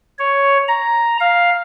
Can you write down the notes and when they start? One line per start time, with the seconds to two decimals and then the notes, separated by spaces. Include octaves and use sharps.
0.19 C#5
0.68 A#5
1.20 F5